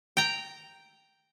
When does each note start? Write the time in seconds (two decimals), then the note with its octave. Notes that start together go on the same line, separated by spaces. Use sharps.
0.17 G5 A#5